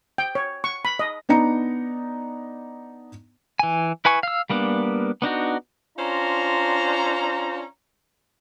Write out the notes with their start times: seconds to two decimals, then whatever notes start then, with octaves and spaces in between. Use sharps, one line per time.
0.18 G5
0.35 C#5
0.64 C#6
0.85 B5
0.99 D#5
1.29 B3 D4 D#4 A#5 C#7
3.59 E3 G#5
4.05 E4 B4 G#5 C#6
4.23 F5 E6
4.50 G3 A#3 B3 D4
5.22 B3 D4 D#4 F#4
5.98 C#4 D4 F4 C5 A#5